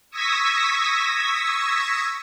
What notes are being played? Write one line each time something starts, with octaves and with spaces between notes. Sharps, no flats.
C#6 D#6 E6 G#6 A#6 B6